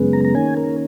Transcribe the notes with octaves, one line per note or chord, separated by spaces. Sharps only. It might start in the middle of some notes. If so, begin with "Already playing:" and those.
Already playing: F#2 C#3 G#3 B3
A#5
A#5
D#3 A#3 C#4 G#5
A#4